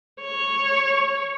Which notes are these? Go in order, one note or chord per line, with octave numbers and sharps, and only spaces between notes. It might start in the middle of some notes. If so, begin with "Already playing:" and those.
C#5